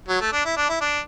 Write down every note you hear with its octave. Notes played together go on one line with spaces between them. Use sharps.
F#3
A3
D4
E4
D4
E4
D4